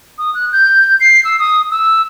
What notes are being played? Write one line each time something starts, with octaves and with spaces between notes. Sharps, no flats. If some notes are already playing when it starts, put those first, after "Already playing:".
D#6
F#6
G6
C7
E6
D#6
E6